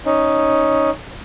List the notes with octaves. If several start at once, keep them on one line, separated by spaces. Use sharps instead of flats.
C#4 D#4